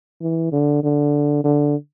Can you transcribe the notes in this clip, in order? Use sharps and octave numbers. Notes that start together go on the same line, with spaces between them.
E3
D3
D3
D3